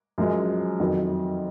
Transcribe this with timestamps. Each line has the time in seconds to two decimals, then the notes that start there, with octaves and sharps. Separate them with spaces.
0.18 F#2 F3 G#3
0.80 F2 D#3 F#3